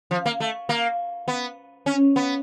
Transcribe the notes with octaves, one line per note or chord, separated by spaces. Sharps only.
F3
A#3
A3
A#3
B3
C#4
B3